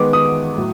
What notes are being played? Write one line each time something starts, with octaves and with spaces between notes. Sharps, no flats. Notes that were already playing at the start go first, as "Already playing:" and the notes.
Already playing: D#3 G#3 B3 D6
D#6
A2 F#3